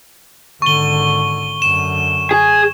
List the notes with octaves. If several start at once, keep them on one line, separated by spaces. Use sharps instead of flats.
G#1 D3 C#6 G7
F#2 D3 E7
G#4